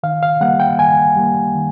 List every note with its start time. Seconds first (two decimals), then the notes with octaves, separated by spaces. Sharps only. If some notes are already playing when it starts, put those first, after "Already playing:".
0.03 D#3 F5
0.23 F5
0.41 G3 A#3 F#5
0.60 G5
0.79 D#3 G#5
1.16 G3 A#3
1.55 D#3